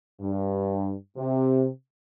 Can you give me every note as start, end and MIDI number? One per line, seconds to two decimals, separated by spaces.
0.21 0.95 43
1.17 1.67 48